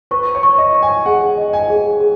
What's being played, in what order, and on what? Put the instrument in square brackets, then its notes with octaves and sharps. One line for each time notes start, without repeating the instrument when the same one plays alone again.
[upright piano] B4 [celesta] C#6
[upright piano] C#5
[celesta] C#6
[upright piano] D#5
[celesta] C#6
[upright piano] G#5
[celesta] G#4 [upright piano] F#5
[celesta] D#5
[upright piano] G#5
[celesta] G#4
G#4